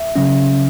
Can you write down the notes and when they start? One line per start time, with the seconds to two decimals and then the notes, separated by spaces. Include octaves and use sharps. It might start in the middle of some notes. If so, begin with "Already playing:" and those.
Already playing: E5
0.16 C#3 F#3 C#4